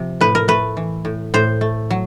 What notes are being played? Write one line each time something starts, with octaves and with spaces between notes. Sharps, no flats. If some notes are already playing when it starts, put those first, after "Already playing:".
Already playing: C3 F3
A2 B4
A#4
A3 B4
E3
A2
A2 C5
A3
F#3